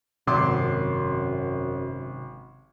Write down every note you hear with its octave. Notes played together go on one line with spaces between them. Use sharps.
G#1 F#2 C3 C6 D6